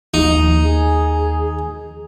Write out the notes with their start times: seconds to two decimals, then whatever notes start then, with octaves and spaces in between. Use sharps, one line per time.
0.14 D#2 D#4
0.63 G#4